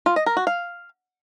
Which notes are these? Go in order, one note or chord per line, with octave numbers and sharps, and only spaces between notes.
F4
D#5
A#4
F#4
F5